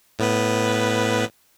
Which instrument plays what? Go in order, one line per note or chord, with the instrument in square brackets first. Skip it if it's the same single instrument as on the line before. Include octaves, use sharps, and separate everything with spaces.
[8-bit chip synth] A2 B3 B4